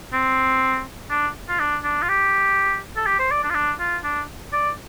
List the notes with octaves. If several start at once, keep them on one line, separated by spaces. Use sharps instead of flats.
C4
D4
F4
D4
D4
F4
G4
A4
G4
C5
D5
D4
F4
D4
F4
D4
D5